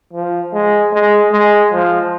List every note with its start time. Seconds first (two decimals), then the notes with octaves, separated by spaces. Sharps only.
0.13 F3
0.53 G#3
0.93 G#3
1.32 G#3
1.72 F3